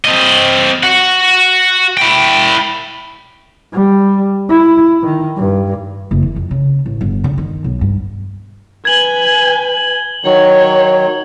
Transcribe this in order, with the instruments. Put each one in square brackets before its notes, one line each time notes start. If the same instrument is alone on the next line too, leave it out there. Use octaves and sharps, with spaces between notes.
[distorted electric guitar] C4 D#5
F#4 F#5
E4 G5
[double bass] G3
E4
D#3
G2
[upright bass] F#1
E3
F2
C#3
A1
G1
D3
D#3
B1
G2
[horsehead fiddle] B4 G#5 [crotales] G#6 F#7 G7
[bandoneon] D#3 F#3 [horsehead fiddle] C#5